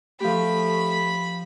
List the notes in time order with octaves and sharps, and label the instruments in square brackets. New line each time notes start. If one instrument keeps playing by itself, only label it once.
[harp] F3 G4 [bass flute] A3 [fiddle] B5